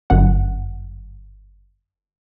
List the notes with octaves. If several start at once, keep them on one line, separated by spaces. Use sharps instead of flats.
G1 F#2 F#5